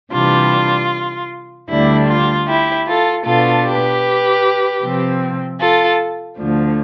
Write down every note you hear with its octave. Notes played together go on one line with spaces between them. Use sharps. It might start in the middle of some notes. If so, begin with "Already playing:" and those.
C3 E3 G3 D4 F4
D2 D3 G3 D4 E4
F4
E4 G4
F4 A4
B2 B3 D4 F4 A4
G4 B4
C3 F3 C4
F4 A4
D2 D3 F3